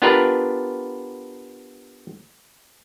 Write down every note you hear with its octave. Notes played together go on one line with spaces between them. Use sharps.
B3 D4 F4 G4 A#4 B4